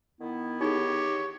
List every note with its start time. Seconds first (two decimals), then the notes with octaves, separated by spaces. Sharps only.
0.20 D#3 B3 E4
0.61 D#4 G4 G#4 C#5